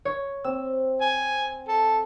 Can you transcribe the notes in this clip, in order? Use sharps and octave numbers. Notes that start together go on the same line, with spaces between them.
C#5
C4 E6
G#5
A4